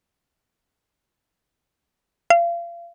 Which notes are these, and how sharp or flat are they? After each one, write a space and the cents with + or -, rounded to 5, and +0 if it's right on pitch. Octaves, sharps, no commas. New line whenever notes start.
F5 -35